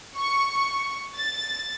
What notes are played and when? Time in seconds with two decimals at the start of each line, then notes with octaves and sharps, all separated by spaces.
0.17 C#6
1.17 A6